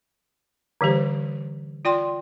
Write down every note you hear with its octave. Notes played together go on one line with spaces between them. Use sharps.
D3 E3 G3 G4 C5
F4 D5 G5 C6